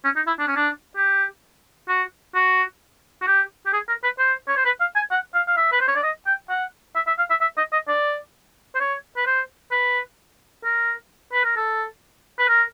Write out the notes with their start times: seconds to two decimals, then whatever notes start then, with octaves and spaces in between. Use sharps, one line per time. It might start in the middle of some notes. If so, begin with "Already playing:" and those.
0.04 C#4
0.16 D#4
0.27 E4
0.39 D4
0.48 C#4
0.56 D4
0.96 G4
1.89 F#4
2.35 F#4
3.22 F#4
3.27 G4
3.66 G4
3.73 G#4
3.88 A#4
4.04 B4
4.19 C5
4.49 C#5
4.57 C5
4.65 B4
4.80 F5
4.96 G#5
5.11 F#5
5.34 F5
5.48 F5
5.57 E5
5.72 B4
5.80 C5
5.88 C#5
5.96 D5
6.03 D#5
6.26 G5
6.50 F#5
6.96 E5
7.07 E5
7.19 F5
7.30 E5
7.41 E5
7.57 D#5
7.72 D#5
7.88 D5
8.75 C5
8.80 C#5
9.17 B4
9.26 C5
9.71 B4
10.64 A#4
11.33 B4
11.44 A#4
11.56 A4
12.39 B4
12.49 A#4